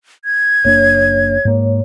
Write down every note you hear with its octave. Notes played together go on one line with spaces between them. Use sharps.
G#6
F#1 A#3 D4 C#5
G#2 A#3